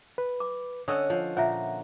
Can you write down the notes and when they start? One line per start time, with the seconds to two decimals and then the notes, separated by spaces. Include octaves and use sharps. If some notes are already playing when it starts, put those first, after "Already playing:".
0.18 B4
0.40 D6
0.88 D3 C#4 C#5 D#5 D#6 E6
1.10 F3
1.37 A#2 C#5 E5 F#5 A#5